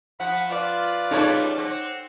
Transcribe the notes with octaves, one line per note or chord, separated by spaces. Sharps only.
F3 F#5 B5
F4 B4 D5 F#6
C#3 G3 A3 D#4 A4 C#5
C4 F#5